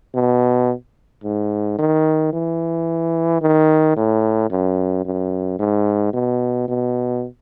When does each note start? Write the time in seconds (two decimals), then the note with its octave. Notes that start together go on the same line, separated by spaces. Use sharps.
0.15 B2
1.24 G#2
1.79 D#3
2.33 E3
3.42 D#3
3.97 A2
4.50 F#2
5.05 F#2
5.59 G#2
6.14 B2
6.68 B2